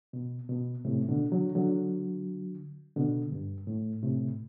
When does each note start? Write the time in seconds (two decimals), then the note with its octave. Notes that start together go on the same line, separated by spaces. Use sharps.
0.13 B2
0.49 B2
0.85 A2 C3
1.08 B2 D3
1.32 D3 F#3
1.55 D3 F#3
2.96 B2 D3
3.32 G2
3.67 A2
4.02 A2 C3